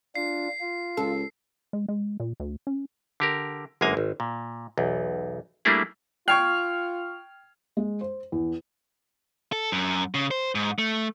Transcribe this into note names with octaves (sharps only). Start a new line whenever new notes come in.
D4 F4 C7
F4
C#2 A4
G#3
G#3
A#2
D2
C#4
D3 G4 A#4
G1 F#2 G#3 A#3 G#5 A#5
G#1
A#2
B1 E2
G3 A3 A#3 D4 E4 G#4
F4 G5 C#6 F6 G#6 C7
G#3
C5
E2
A4
F#2
C#3
C5
G#2
A3